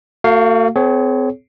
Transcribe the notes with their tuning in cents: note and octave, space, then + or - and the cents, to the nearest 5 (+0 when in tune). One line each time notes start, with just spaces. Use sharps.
A3 +45 F#4 +0 F5 +0
C4 -35 G#4 +35 C#5 +0